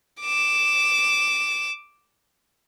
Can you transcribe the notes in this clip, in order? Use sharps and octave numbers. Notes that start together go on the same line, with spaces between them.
D6 E7